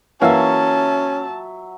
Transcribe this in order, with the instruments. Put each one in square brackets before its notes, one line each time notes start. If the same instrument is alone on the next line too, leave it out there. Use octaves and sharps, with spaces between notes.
[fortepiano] E3 A#3 F5 [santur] F#3 E5 [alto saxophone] C#4 [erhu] A5